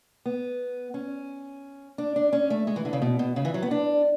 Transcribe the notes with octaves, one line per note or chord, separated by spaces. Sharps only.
B3
C#4
D4
D4
C#4
A3
G#3
E3
D3
C#3
B2
B2
C#3
E3
F#3
B3
D4